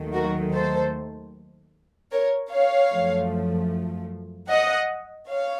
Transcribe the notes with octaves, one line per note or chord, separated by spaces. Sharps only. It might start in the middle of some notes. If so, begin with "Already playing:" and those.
Already playing: D#2 D#3 F#3 A3
F#4 A#4
A4 C5
A#4 C#5
C#5 F5
F#2 F3 A3
D#5 F#5
C#5 F5